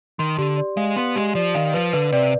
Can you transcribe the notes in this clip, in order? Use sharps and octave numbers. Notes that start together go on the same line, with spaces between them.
D#3 C6
D3 G4
D5
G#3 F5
B3 C6
G#3 G4
F3 D5
D#3 F5
F3 B4
D3 B4
C3 D5